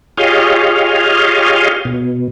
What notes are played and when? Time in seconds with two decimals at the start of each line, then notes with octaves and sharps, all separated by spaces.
0.18 F4 G4 G#4 C#5 D#5 F5
1.85 B2